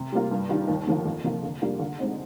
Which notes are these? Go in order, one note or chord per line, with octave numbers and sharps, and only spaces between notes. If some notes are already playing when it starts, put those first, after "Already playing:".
Already playing: C3
G3 A#3 F4
G2
D#3 G3 D4 F4
D#2
D3 F3 A#3 F4
F2
C3 F3 A#3 F4
D3
G3 A#3 D4 F4
D3
G#3 C4 D#4